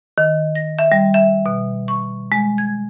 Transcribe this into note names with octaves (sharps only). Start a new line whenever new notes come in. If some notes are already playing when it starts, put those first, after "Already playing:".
D#3
A#6
E5
G3
E5
B2
C#6
G#3
G#6